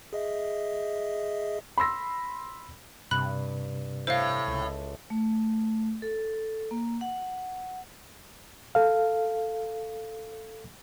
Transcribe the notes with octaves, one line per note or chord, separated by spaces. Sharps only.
G#4 D#5 E5
B5 C6 E6 A#6
G2 C3 B5 F#6
A2 C5 F5
C#2
A3
A4
A#3
F#5
A4 F5